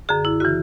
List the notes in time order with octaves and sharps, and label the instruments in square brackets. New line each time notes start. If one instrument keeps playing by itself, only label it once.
[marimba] F#2 D3 G#4
E4
C#3 E3 F#4